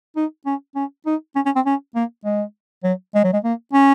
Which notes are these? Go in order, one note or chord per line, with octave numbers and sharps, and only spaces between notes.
D#4
C#4
C#4
D#4
C#4
C#4
C4
C#4
A#3
G#3
F#3
G#3
F#3
G#3
A#3
C#4